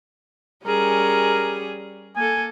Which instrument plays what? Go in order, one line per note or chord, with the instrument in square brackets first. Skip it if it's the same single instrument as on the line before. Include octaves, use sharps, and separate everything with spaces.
[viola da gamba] G3 C#4 G#4 [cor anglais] A#4
[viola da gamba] A#3 A4 [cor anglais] G#5